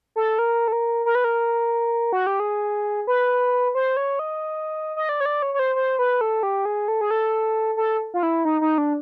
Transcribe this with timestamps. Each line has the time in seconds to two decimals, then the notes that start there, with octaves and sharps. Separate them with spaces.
0.16 A4
0.39 A#4
0.68 A4
0.72 A#4
1.06 A#4
1.15 B4
1.24 A#4
2.13 F#4
2.27 G4
2.40 G#4
3.07 B4
3.75 C5
3.97 C#5
4.19 D#5
4.96 D#5
5.09 D5
5.20 C#5
5.26 D5
5.42 C#5
5.54 C#5
5.59 C5
5.75 C5
5.99 B4
6.21 A4
6.43 G4
6.65 G#4
6.88 A4
7.01 G#4
7.11 A4
7.77 A4
8.14 F4
8.23 E4
8.45 D#4
8.61 D#4
8.78 D4